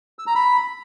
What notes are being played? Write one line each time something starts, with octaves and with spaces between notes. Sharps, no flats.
E6
A#5
B5